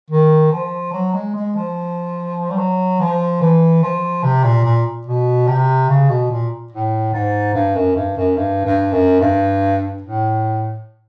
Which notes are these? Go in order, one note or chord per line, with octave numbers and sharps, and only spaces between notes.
D#3
F3
F#3
G#3
G#3
F3
G3
F#3
F3
E3
F3
C3
A#2
A#2
B2
C3
C#3
B2
A#2
A2
G#2
G2
F#2
G2
F#2
G2
G2
F#2
G2
A2